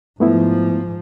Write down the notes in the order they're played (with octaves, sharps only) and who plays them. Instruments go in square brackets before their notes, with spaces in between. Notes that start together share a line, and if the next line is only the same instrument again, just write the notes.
[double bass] G#2 F3 [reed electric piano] A3 B3 E4